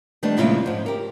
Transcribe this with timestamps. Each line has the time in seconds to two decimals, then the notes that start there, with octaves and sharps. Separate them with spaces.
0.23 D#3 G3 A3 B3 D4
0.37 F2 A#2 C#3 G#3 E4 F4
0.66 G#2 F3
0.86 G4 A#4